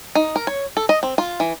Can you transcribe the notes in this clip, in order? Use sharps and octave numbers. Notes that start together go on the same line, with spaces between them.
D#4
A#4
C#5
A4
D#5
C4
F4
E3